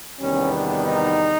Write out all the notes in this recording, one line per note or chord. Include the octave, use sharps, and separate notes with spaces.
E2 C3 D#3 G3 B3 C#4
D4
D#4